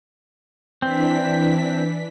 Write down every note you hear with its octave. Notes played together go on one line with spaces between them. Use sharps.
E3 C4 D4 B6